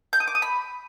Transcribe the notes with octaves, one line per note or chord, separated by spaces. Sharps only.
G6
D#6
D6
D#6
B5